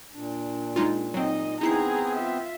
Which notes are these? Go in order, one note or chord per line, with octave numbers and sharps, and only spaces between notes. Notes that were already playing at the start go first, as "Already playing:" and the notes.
A#2 D4
G#3 D#4 F4
F#3 C4 D#4 D#5
B3 C4 D#4 E4 G#4 A#5 C7
F4 E5